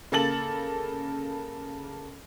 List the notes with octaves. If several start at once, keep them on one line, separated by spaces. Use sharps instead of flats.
C#3 A#3 A4 A6 F#7